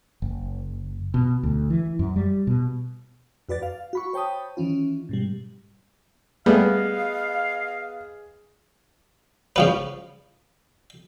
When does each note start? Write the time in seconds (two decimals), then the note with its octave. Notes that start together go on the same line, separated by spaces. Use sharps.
0.22 F#1
1.14 B2
1.43 D2
1.70 E3
1.99 F#2
2.16 G3
2.47 B2
3.49 F2 F#4 B4 D5 A6
3.63 F5
3.93 F#4 B5 C#6
4.13 C5 C#5 G5 A5 B5 D#6
4.57 D#3 E3 C#4 F4
5.09 G#2 B2 G3
6.46 G3 A3 B3 G#4 D#5 F5
9.56 C#3 F3 B4